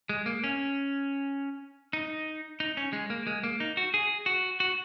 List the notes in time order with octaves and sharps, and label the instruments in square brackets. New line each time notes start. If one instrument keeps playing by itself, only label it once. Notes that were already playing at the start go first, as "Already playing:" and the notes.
[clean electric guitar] G#3
A#3
C#4
D#4
D#4
C#4
G#3
A#3
G#3
A#3
D#4
F#4
G#4
F#4
F#4